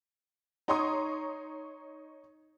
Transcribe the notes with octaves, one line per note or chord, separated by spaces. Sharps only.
D#4 C#5 A#5 C6 C#6 D#6